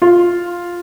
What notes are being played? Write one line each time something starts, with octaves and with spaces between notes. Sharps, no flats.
F4